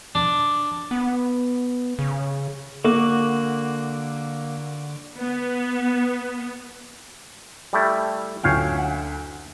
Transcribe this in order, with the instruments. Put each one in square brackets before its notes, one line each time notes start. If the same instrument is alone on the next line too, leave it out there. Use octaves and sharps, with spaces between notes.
[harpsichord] D4
[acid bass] B3
C#3
[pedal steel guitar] D3 F#4 D6 [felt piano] A#3
[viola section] B3
[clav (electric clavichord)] G3 A3 E4
[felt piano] F#1 D2 G#5 [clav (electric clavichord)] C#5 F5 G5
[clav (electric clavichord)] F#5